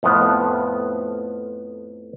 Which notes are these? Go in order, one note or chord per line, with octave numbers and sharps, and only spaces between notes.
F2 A2 F3 B3